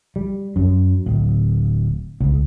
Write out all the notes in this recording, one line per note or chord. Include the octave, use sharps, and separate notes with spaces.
G3
F#2
D1
C#2